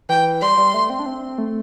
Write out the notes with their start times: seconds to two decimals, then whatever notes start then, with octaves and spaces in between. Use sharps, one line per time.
0.09 E3 G5
0.42 G3 C6
0.58 G3
0.74 A3
0.90 C4
0.99 D4
1.06 C4
1.38 A3